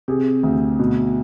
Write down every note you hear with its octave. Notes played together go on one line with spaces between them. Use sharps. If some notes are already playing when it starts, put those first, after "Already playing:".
C3 G#4
D2
B2